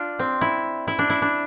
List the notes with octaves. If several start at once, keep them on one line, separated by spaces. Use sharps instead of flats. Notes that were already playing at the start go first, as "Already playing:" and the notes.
Already playing: D4 F4
C4
E4
E4
D4
E4
D4